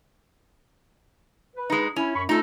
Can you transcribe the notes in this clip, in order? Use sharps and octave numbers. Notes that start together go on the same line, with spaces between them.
B4
G#3 D#4
C#4 E4
F#2 B5 C#6
A3 D#4 F4 A4